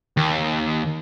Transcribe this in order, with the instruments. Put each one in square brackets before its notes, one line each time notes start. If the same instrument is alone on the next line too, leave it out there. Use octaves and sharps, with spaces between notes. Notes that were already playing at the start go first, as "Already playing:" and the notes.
[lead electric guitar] D#2